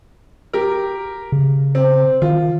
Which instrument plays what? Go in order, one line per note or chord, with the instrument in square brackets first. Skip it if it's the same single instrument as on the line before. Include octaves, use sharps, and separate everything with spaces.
[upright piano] G4 A#4
[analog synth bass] C#3
[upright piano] C4
[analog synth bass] D#3 [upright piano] F4